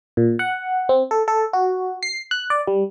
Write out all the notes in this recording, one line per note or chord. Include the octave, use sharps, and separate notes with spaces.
A#2
F#5
C4
A4
A4
F#4
C7
F#6
D5
G3